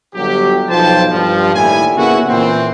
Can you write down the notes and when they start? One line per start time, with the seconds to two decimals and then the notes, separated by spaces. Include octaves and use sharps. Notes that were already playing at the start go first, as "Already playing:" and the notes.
0.15 G1 F#3 G4
0.70 B1 F3 F4 C5 G5 A5
1.12 G2 F3
1.55 D#2 A2 G3 E4 G#5
1.97 C#3 A#3 B3 E4 F#4
2.28 A#2 E3 C4